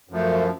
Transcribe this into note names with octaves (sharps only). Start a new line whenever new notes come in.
F#2 F3 A3